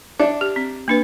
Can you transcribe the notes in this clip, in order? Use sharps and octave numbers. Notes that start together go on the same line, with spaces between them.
D4 E5
G4
C4
A#3 D4 B4